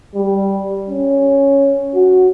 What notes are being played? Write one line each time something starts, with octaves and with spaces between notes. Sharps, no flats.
G3
C#4
F#4